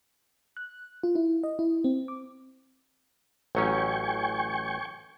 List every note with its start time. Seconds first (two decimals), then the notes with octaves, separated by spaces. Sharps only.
0.57 F#6
1.03 F4
1.15 E4
1.43 D#5
1.59 E4
1.84 C4
2.08 D6
3.55 A1 F#3 C#4 G5 G#5 C#6